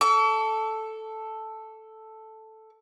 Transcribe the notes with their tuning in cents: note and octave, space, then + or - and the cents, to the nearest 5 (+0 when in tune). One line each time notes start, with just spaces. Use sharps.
A4 +0 C#6 +45